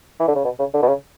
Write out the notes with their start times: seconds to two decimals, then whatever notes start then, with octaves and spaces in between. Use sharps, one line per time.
0.20 E3
0.28 D3
0.35 C#3
0.44 B2
0.59 C#3
0.74 D3
0.83 B2
0.88 C#3